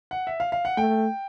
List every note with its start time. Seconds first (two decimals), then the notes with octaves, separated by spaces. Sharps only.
0.11 F#5
0.27 E5
0.40 F5
0.52 F5
0.65 F#5
0.77 A3 G5